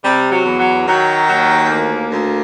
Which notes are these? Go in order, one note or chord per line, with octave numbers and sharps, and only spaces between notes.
C3 G3
F#3
E2
F#3
D#3 F#3
D#2 F#3
D2 A#3
D2